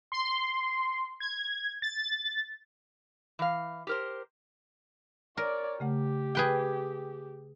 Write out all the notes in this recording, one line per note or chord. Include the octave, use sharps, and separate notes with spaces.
C6
G#6
A6
E3 F5
G4 A#4 C5
A#4 C#5 D5
C#3 A3 G4 F#5
G#4 B4 G5